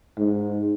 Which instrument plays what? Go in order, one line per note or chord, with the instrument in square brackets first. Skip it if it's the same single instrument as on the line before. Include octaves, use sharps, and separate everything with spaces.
[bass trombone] G#2